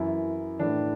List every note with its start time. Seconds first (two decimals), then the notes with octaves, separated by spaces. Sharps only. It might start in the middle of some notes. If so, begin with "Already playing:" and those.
Already playing: F#2 E3 E4
0.59 A2 E3 D4